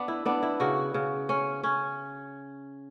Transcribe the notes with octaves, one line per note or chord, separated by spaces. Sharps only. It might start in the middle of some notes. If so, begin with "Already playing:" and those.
Already playing: B3 D4
E4
B3 D4
E4
C#3 F#4
C#3
C#4
C#4